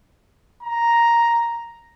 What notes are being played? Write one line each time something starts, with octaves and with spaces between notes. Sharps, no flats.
A#5